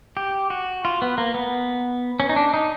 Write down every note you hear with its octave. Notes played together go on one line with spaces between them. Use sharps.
G4
F#4
F4
B3
A#3
B3
C#4
D#4
D4
D#4